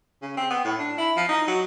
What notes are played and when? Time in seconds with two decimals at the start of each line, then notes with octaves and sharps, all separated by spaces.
0.22 C#3
0.37 C4
0.50 B3
0.65 A2
0.79 D4
0.98 E4
1.17 F3
1.29 D#4
1.47 F#3